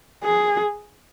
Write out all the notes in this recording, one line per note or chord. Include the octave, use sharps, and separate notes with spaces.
G#4